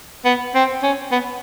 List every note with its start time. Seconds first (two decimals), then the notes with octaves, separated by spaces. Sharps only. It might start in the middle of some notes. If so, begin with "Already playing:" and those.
0.25 B3
0.54 C4
0.83 C#4
1.12 B3